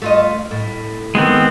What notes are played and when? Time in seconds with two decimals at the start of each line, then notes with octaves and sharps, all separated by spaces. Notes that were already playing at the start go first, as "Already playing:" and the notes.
0.02 A3 F4 D#5
0.51 A2
1.15 D#3 G#3 B3 C4